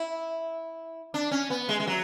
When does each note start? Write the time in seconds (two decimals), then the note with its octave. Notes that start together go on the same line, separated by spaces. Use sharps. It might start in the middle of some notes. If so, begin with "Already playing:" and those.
Already playing: E4
1.14 D4
1.31 C#4
1.50 B3
1.69 G#3
1.80 G#3
1.87 F#3